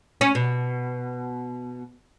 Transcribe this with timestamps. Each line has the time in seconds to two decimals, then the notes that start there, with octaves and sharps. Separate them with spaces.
0.21 C#4
0.35 B2